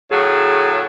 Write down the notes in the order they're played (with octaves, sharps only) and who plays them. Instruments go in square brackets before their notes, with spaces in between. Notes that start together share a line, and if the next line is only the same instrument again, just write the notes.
[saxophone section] A2 C#3 F#3 [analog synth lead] G#4